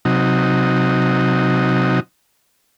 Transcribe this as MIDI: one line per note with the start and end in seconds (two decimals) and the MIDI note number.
0.05 2.00 48
0.05 2.00 54
0.05 2.00 63